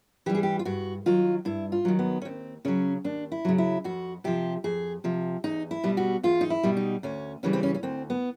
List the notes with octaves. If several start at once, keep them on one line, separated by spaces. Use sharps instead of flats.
E3 G3 G4
G#4
G4
F4
G2 F#4
D#3 F#3 F4
G2 E4
F4
D#3 F#3
B3
C#4
D#2 C4
C#3 F#3 C#4
D#2 D4
E4
C#3 F#3
E4
F2 F#4
C3 F3 G4
F2 G#4
C3 F3
E2 D#4
E4
B2 G3
F#4
E2 F4
D#4
E4
B2 G3
D#4
D2 C#4
C#3 E3 G3 C#4
C4
C#4
C#4
D2 C4
B3